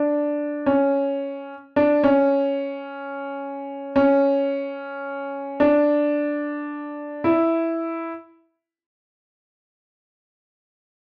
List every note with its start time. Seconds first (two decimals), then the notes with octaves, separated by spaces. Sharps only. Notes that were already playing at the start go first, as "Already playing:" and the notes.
Already playing: D4
0.66 C#4
1.76 D4
2.04 C#4
3.96 C#4
5.60 D4
7.24 E4